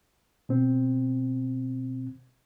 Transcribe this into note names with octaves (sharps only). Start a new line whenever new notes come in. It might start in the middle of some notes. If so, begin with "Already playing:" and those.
B2 C4